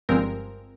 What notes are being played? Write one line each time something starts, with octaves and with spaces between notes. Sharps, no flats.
G1 G2 F3 G#3 C4 A#4